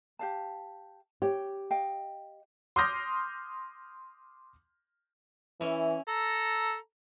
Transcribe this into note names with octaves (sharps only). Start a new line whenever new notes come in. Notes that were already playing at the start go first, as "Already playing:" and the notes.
G4 F5 A5
G4 C#5
D#5 F5 G5
C6 D6 D#6 F6 G6 A#6
E3 C#4 E4
A4 A#5